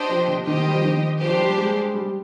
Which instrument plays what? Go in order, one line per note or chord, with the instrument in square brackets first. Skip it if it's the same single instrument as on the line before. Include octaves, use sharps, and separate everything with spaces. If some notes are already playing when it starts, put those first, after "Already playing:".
Already playing: [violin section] D4 G4 C5 D#5 G5
[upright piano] F3
D3
[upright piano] D#3 [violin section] G4 C5 D#5 G5
[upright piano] G3
F3
D#3
[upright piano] F3 [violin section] D4 G4 C5
[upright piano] G3
G#3
G3